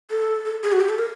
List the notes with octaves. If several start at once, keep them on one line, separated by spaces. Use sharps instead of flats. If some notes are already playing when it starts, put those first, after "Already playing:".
A4
A4
G#4
F#4
G4
A4
A#4